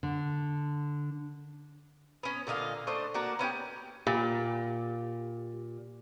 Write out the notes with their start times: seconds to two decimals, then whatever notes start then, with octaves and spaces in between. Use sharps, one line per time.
0.03 D3
2.23 B3 C#4
2.47 A#2 D3 D#5 F5
2.87 A3 D4 C5 D#5
3.14 A#3 D4 F#4 A#4
3.39 B3 C#4 E4 G4
4.07 A#2 G4